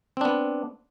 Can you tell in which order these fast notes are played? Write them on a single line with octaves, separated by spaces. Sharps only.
C4 D4 B3